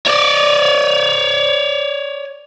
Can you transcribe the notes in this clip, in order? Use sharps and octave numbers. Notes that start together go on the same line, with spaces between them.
C#5 D5